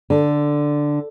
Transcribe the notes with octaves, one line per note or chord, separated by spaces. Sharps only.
D3